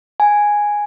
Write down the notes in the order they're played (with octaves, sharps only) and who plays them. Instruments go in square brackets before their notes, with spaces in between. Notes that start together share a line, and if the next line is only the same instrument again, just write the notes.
[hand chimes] G#5